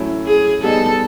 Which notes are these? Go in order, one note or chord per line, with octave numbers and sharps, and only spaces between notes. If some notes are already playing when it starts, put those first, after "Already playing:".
Already playing: A2 F#3 A3 C#4 E4
G#4
G3 B3 D#4 G#4 A4